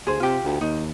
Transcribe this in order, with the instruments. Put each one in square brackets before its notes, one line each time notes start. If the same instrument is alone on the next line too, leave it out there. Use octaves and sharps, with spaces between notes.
[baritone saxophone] D2 [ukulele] G#4 C5
[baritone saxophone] C3 [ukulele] F4 G4
[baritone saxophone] D2
[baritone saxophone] D#2 [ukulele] D#4